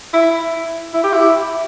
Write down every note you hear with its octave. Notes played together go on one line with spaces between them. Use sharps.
E4
E4
G4
E4